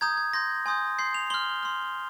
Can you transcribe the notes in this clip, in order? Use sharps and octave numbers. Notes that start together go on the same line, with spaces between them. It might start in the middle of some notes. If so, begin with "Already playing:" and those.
A#5 D#6 G6 G#6
G#6
C6 G6 A#6
G#5 C6 D#6 G6
C6 G6 C7
F7
C6 F6 G7
C6 F6